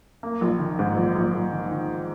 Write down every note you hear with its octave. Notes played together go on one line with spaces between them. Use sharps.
A#3
A#1
D#3
G#2
A#1
A#1
A#1
D#3
D#3